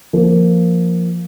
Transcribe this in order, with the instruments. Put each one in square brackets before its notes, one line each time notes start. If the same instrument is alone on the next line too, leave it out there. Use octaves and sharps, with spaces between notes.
[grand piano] F3 A#3